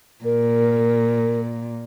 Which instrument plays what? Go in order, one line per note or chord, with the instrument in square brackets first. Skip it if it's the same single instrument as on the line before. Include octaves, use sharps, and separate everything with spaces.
[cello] A#2 [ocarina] A#4